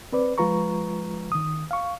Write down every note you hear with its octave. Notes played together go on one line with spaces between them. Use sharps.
C4 B4 D5
F3 G#3 F4 B4 A#5 C#6
D#3 D#6
F5 C#6